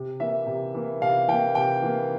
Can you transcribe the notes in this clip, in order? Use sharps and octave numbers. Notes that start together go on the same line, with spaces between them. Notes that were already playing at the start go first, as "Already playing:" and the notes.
Already playing: C3
E3 A#3 E5
C3
E3 A#3
C3 F5
E3 A#3 G5
C3 G5
E3 A#3